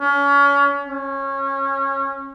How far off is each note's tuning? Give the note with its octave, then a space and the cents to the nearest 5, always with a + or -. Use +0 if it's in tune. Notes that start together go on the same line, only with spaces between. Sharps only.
C#4 +35
C#4 -20